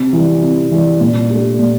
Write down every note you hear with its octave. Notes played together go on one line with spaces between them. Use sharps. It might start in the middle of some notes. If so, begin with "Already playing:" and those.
Already playing: C3
E3 G3
C3
E3 G3
A#2
A3 D4 G4
A#2